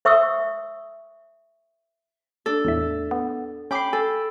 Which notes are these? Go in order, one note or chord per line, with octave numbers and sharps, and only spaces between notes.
C5 E5 C#6 D#6 E6
D4 A4
E2 A2 E5
B3
C#4 G5 B5 D6 C7
A4 G#5